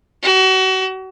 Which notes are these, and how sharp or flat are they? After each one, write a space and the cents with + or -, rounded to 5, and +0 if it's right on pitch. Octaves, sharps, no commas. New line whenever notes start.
F#4 +35